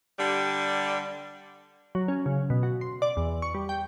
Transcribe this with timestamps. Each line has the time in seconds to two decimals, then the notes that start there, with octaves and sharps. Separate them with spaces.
0.18 D3 G3
1.95 F#3
2.08 C#4
2.26 C#3
2.50 B2
2.63 F#4
2.81 C6
3.02 D5
3.17 E2
3.42 C#6
3.54 G3
3.69 G5